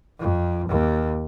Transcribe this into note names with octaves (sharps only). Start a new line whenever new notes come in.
F2
D#2